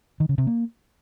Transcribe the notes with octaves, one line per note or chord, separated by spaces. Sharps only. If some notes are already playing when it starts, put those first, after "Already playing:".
D#3
C#3
C3
A#3